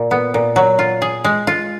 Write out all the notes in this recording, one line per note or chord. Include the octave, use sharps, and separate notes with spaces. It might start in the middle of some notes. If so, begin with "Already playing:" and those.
Already playing: A#2
B3
A#2
F#3
F4
G#4
G#3
F4